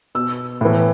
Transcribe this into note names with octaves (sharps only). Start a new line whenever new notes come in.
B2 E6
A2 E3